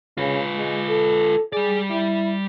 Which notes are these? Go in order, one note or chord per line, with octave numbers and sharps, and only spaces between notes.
C#3 F4 B4
G#3
A4
G3 G#4 D5
E4